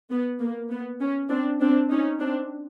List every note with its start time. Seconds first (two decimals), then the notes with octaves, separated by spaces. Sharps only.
0.10 B3
0.40 A#3
0.70 B3
1.01 C#4
1.30 C4 D4
1.61 C4 D4
1.91 C#4 D#4
2.20 C4 D4